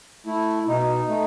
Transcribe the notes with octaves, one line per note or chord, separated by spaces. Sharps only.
A3 E4
B2 D#4
A3